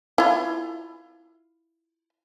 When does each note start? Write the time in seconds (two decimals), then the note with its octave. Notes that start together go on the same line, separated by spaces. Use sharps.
0.18 E4 F4